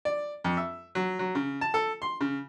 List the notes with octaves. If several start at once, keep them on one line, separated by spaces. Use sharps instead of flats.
D5
F2
E5
F#3
F#3
C#3
A5
A4
C6
C#3